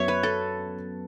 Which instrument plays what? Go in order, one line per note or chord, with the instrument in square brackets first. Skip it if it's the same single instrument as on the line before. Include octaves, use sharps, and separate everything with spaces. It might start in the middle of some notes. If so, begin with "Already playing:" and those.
Already playing: [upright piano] F#2 F#3 B3 [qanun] C#5 E5
[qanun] B4
A4